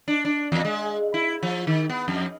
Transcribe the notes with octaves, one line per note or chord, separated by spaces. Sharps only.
D4
D4
E2
G#3
E4
F3
D#3
B3
F2